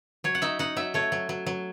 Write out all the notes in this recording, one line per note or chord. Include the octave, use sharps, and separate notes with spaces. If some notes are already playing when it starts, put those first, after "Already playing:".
F#3 C#5
F#5
D#4 E5
D#4 F#5
F#3 E5
A3 C#5
F#3
F#3
F#3